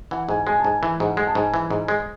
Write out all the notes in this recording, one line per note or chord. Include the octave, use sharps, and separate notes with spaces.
E3 F#5
G#2 G#5
G#3 G#5
A5
G#2 G#5
E3
G#2 F#5
G#3
A5
G#2 G#5
E3
G#2
G#3